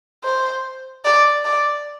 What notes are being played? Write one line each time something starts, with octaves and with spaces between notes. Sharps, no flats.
C5
D5
D5